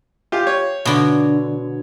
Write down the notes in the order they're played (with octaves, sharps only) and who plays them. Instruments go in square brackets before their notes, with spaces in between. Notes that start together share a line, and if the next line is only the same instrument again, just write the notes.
[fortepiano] F4 G4
C#5
[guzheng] B2 D3